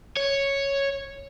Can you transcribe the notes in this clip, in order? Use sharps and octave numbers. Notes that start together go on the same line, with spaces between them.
C#5